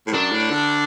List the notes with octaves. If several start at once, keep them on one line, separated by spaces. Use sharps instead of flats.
A2
F#2 D4
A2
D3